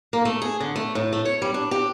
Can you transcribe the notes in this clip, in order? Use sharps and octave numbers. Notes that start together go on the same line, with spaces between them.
A#3
A3
G#4
D3
A3
A2
A3
C#5
G3
D4
G4